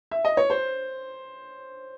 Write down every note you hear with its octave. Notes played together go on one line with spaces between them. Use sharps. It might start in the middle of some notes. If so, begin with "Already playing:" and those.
E5
D#5
C#5
C5